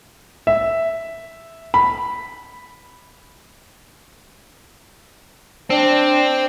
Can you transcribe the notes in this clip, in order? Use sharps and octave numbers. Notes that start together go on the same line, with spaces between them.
E5
B5
C4 D4